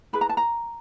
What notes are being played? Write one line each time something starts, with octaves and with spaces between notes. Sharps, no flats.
E4 G#4 B4 B5
A#5
A5
A#5